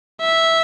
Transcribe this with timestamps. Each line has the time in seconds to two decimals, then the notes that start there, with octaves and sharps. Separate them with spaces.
0.21 E5